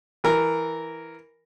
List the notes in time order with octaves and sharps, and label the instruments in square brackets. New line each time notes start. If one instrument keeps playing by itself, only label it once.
[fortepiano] E3 A#4